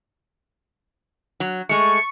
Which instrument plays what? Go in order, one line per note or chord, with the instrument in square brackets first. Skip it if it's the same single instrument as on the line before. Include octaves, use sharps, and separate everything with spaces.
[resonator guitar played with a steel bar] F#3
[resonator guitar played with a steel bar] G#3 A3 [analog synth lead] C#6